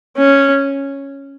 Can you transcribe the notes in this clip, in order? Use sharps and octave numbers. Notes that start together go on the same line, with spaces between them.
C#4